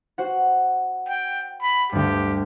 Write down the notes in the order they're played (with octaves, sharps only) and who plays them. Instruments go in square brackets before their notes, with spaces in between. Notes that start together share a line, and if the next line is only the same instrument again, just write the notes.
[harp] F#4 C5 F#5
[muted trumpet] G5
B5
[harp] D2 G2 [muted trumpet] G4